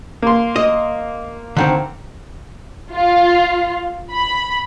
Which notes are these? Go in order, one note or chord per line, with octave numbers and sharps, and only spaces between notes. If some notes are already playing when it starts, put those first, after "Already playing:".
A#3 C6
D#5
D3 D#3 C4
F4
B5